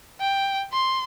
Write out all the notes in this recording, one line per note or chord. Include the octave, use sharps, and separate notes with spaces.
G5
C6